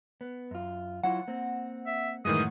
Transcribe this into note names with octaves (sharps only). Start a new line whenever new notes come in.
B3
F#2 F4
F#3 E4 F4 F#5
A#3 C4
E5
F#2 A2 D#3 E3 G#3 D#6